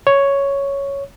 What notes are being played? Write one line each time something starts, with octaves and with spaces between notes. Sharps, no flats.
C#5